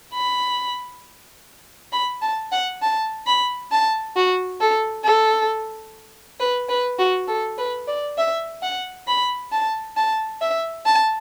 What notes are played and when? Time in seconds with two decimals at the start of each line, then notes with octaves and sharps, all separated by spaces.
0.14 B5
1.92 B5
2.22 A5
2.52 F#5
2.82 A5
3.27 B5
3.71 A5
4.16 F#4
4.61 A4
5.05 A4
6.40 B4
6.69 B4
6.99 F#4
7.28 A4
7.58 B4
7.87 D5
8.18 E5
8.62 F#5
9.07 B5
9.52 A5
9.97 A5
10.41 E5
10.85 A5